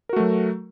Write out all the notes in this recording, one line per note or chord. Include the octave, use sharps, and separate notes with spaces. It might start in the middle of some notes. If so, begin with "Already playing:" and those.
F#3 A3 F#4 A#4